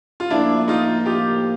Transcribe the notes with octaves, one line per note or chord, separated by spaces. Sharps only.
F4
A2 F3 A#3 D4 E4
D#4 F4
F4 G4